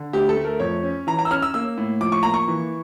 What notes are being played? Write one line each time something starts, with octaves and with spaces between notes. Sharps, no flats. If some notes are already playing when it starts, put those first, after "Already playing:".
Already playing: D3
D2 G4
A4
A3
A#4
F2 C#5
C#4
E3 A#5
A#5
E6
C#4 F6
E6
A#3 E6
A2
F3 D6
C#6
A#3 A#5
C#6
E3